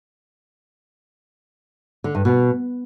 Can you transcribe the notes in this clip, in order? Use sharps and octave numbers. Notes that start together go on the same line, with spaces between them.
D3
G2
B2